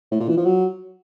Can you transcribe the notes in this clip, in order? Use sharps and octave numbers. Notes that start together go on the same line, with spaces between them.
A2
A#2
E3
F3
F#3